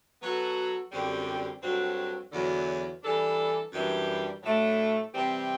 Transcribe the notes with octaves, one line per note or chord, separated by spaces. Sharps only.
F#3 B3 F#4 A4
F#2 D3 G3 C4 G4
G2 F#3 C4 F#4 A4
E2 D3 F#3
E3 G3 D4 A4
F#2 E3 G3 D4
A2 F#3 A3 D4
C3 E3 G3 C4 G4